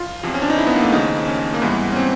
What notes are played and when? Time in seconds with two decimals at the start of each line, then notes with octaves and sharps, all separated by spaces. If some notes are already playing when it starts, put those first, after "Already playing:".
Already playing: F4
0.23 E2 C3 F3
0.34 C#4
0.42 D4
0.50 D#4
0.58 E4
0.67 B3
0.75 A#3
0.84 A3
0.92 D#2 C#3 F3 D#4
1.27 C#4
1.54 A#3
1.62 G#2 E3 G3 B3
1.92 C#4
1.96 C4